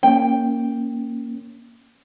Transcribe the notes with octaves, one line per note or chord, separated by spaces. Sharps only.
A#3 C#4 G5